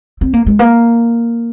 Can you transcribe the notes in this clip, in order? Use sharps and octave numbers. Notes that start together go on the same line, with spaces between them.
C4
A#3
G#3
A#3